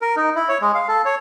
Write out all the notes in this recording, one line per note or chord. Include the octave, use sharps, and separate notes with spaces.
A#4
D#4
E4
C#5
G#3
F5
A4
C#5